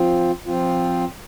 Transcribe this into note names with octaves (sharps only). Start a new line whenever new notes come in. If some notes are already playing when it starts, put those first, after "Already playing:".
Already playing: F3 C4 F4
F3 C4 F4